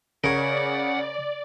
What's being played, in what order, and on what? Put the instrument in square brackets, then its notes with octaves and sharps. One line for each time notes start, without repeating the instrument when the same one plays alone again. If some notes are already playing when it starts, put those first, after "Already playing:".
[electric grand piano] C#3 [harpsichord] A#4 C#5 [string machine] D5 [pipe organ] F#5